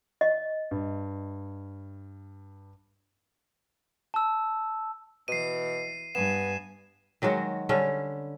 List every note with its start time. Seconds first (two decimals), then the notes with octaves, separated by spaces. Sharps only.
0.21 D#5
0.71 G2
4.14 A5 E6
5.28 B2 E3 C7 D#7
6.15 G2 B3 G#5 E7
7.22 D#3 F#3 G#3 F#4
7.69 D3 G3 C#4